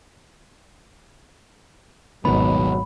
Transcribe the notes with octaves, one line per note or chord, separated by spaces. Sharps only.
D#1 G#1 B2 D#3 F#3 B3 B5